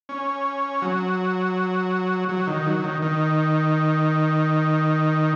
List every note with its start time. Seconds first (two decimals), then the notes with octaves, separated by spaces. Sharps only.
0.09 C#4
0.82 F#3
2.29 F#3
2.47 D#3
2.66 F#3
2.84 D#3
3.02 D#3